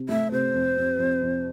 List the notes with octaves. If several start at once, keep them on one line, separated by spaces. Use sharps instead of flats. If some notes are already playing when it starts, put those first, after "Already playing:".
Already playing: C3
A3 E5
C3 C5
F2
F2
F2
F2